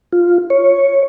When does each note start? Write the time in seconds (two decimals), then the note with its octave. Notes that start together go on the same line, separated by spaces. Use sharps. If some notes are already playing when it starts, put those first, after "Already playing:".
0.12 F4
0.50 C#5